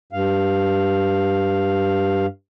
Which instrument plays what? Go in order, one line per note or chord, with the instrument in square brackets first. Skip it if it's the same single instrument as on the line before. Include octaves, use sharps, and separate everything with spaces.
[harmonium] G2 F5